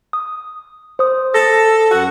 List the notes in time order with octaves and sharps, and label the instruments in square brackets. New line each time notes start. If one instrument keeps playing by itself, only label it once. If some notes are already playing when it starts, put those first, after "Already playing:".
[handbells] D#6
C5 D#6
[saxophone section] A4 [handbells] A#6
[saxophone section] F#2 F#4 F#5